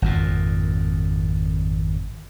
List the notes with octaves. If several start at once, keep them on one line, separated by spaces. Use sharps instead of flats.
G#1 F2 A#2